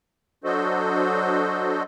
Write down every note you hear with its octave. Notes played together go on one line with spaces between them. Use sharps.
F#3 D4 F#4 A4 C5 D#5